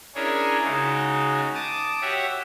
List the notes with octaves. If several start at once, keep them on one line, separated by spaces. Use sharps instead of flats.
C#4 D4 E4 G#4 A#4 C#5
C#3 G#3 D#4 F#4
A5 D6 D#6
F#4 G4 C#5 E5 F#5